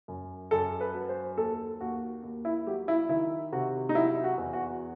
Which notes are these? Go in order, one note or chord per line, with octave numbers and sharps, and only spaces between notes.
F#2
F#2 A4
B4
F#3
C5
D#2 A4
D#2 F#4
D#2
E4
F#3 G4
E4
D#3 E4
C3 F#4
D#4
F#3 E4
F#4
E2
F#4